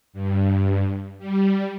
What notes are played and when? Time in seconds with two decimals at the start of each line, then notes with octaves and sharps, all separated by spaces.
0.13 G2
1.19 G3